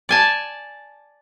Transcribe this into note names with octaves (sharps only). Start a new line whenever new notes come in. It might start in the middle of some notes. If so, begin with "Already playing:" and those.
D5 G#5 A5